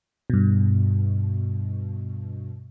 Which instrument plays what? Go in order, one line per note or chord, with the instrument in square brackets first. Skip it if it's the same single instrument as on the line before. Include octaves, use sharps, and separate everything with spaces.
[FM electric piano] G2 B2